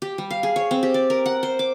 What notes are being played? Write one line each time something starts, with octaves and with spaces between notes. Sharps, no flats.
G4
G3
F5
G#4
C#5
C4
G4
D5
A#4
F#5
C5
D6